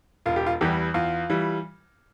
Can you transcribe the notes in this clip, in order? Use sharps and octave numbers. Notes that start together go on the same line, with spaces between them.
E1 F4
G4
F4
E2 E3 G3 G4
E2 F4
E3 G3